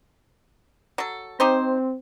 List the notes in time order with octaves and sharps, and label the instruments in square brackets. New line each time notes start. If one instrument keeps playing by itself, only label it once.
[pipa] F#3 A4
[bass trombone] C4 [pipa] D#4 G4 C5